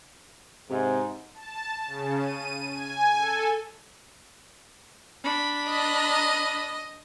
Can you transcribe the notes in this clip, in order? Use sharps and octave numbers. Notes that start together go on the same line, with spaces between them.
G#2 C3
A5
C#3
D#7
G#5
A4
D4 B5
D#5